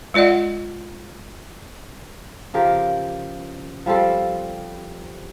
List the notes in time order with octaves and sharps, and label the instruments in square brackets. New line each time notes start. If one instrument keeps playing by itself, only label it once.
[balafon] G#3 F4 D5 D#5 F#5
[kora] C#3 F3 G4 A#4
F3 G3 C4 A4